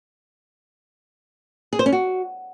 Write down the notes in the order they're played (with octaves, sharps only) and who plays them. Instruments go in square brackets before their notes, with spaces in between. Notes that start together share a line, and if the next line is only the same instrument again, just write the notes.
[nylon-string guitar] G#4
C5
C#4
F#4